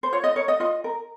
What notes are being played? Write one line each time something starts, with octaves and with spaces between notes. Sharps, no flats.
C5
F4 C#5
D#5
A#4 C#5
D#5
F4 D#5
A#4